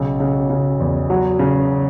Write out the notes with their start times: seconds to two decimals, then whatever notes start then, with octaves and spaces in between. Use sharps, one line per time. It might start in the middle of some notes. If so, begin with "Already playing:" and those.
Already playing: B1 C#3
0.20 C#3
0.50 C#3
0.80 E2
1.10 F#3
1.39 C#3